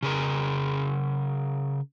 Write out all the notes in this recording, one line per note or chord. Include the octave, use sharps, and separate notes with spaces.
C#3 G#4 A#4